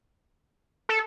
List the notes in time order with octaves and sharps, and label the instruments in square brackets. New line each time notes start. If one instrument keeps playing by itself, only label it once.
[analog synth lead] A4